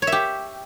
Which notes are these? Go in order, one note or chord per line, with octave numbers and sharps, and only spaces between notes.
C#5
E5
G4